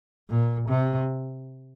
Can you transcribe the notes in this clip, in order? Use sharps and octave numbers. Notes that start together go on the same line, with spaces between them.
A#2
C3